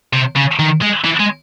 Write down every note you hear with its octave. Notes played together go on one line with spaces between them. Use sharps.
C3
C#3
D#3
G#3
E3
G#3